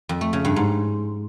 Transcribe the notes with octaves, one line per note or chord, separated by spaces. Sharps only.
F2
A3
C#3
G2
G#2